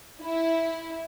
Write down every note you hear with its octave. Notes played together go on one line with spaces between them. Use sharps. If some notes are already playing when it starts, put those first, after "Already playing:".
E4